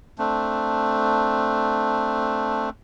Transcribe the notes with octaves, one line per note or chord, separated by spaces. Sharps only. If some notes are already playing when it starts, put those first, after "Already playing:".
A3 C4 D4